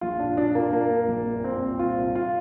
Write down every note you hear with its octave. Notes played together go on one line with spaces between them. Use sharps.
A#1 F4
A#2 D4
A#2 D4
A#2 A#3
A#2 A#3
A#2
A#1
A#2
A#2 C4
C2
A#2 F4
C2
F4